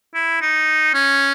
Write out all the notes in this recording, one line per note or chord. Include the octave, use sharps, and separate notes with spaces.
E4
D#4
C#4